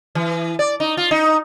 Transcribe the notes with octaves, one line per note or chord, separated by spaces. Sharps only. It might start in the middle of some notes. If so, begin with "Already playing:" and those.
E3
D5
D#4
F4
D#4